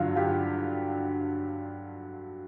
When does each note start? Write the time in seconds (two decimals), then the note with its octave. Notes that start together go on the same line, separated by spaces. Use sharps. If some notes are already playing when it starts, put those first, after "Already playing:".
Already playing: G2 D3 F#3 F4
0.16 F4 G4